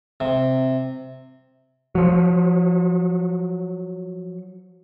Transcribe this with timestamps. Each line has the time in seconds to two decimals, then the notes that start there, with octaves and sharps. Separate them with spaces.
0.20 C3
1.95 F3 F#3